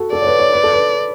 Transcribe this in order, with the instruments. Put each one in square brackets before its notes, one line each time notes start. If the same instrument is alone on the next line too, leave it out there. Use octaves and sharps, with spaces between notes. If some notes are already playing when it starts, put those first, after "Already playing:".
Already playing: [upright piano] F#4 A4
[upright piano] A4 [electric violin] D5
[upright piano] C#5
B4
C#5
B4
A4
B4